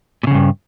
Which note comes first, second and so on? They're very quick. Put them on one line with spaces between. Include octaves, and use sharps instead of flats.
A#2 C#3 E2 G2